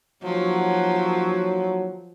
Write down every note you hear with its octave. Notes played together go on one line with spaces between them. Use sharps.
D#2 F3 F#3